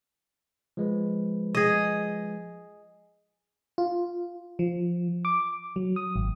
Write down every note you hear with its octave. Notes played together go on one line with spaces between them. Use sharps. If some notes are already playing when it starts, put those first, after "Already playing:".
F3 G#3 B4
G#4 D#5
F4
F3
D6
F#3
D#6
G#1